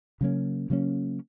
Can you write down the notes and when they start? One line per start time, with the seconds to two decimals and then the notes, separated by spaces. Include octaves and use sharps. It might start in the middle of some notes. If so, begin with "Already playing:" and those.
0.21 C#3 F#3 A#3 C#4
0.70 C#3 F#3 A#3 C#4